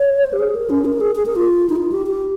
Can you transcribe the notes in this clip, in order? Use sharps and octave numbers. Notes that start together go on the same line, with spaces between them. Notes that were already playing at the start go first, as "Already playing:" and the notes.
Already playing: C#5
C5
G4
G#4
A#4
C#4
A#4
G#4
G#4
A#4
F4
D#4
F4
G4
G4